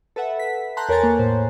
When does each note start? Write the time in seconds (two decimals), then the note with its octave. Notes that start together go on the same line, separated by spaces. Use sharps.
0.16 A4 B4 E5 F#5
0.39 B6
0.77 A5 A#5 C6 F#6 G6
0.89 E2 A#4 C#5 G#5 A#5 A6
1.01 A#3 C#5
1.19 A2 C5